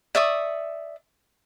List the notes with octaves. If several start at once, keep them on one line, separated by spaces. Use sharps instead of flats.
D5 E5 C#6 D#6